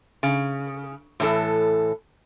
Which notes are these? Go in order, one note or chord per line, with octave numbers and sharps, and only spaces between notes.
C#3
A2 E3 A4